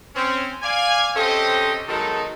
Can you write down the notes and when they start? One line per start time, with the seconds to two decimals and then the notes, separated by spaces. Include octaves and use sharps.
0.15 C4 C#4
0.62 D5 F5 G#5
1.16 C3 C#4 A4 C5 D#5 G5
1.87 D#3 F#3 G#3 B3 D#4 A4